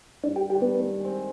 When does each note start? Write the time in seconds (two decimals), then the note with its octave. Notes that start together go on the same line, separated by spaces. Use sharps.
0.24 G2 D4
0.36 G4
0.50 D#3 G3 D4 G4
0.62 B3
0.74 D#3
1.00 G#3 C4